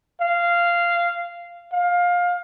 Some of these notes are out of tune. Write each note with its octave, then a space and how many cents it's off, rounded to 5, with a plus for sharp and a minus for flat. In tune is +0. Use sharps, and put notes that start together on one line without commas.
F5 -15
F5 +20